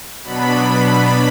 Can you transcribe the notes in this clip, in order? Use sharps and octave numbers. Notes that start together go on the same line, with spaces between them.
B2 F#3 B3 D4 B5